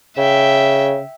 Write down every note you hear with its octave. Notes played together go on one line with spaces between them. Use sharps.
C#3 E5 G5